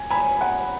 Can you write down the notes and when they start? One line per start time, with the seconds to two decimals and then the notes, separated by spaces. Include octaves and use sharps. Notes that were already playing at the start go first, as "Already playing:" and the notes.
Already playing: G#5
0.10 G#5 B5
0.41 F#5